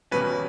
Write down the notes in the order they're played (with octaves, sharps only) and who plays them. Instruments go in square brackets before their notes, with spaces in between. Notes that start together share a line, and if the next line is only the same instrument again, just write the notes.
[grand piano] E1 E2 B2 G3 C#4 B4